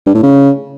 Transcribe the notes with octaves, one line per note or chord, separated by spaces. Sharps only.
G2
A2
C#3